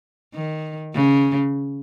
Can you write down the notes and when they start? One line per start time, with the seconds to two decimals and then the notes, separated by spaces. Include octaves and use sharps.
0.35 D#3
0.94 C#3